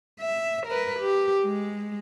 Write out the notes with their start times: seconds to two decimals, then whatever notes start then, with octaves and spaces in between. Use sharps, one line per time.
0.20 E5
0.67 A#4 B4
1.00 G4
1.45 G#3